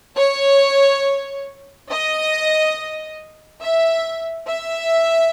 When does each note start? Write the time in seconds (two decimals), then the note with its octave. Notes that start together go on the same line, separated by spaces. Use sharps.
0.16 C#5
1.89 D#5
3.61 E5
4.47 E5